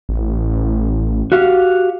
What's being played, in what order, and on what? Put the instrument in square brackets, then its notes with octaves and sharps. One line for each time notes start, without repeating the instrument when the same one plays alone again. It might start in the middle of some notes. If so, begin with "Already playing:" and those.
[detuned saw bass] A1
[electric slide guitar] F#4 G4 F5